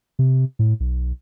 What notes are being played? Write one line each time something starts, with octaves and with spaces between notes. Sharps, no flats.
C3
A2
B1